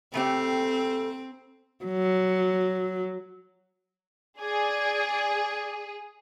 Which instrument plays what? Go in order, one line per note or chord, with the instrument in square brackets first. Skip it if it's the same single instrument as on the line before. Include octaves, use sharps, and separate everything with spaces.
[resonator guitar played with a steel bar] C#3 A3 G4 [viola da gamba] C4
[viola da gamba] F#3
[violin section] G#4 [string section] D5 G#6